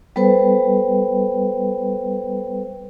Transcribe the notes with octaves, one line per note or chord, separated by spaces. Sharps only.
G3 B3 A4 B4 C5 G5